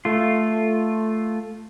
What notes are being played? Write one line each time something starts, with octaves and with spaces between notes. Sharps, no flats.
A3 F4